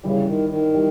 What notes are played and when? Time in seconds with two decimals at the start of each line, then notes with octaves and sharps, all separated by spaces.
0.03 G1 G2 C#3 E3 G3
0.26 D#3
0.49 D#3
0.73 E3 G3